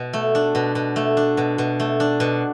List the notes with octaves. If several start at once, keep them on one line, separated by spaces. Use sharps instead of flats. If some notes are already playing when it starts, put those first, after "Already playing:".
Already playing: B2
A3
D4
B2
B2
A3
D4
B2
B2
A3
D4
B2